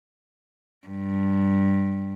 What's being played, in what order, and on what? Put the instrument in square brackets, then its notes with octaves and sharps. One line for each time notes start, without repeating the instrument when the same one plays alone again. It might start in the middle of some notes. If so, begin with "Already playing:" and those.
[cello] G2